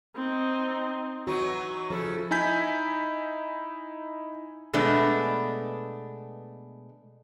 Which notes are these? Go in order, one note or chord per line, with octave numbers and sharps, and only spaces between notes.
C4 D#4
E3 F#3 D#4 F#4 C#6
C#3 F3 E4 A4
D#4 E4 G#5 G6 B6
B2 G#3 A3 B3 D4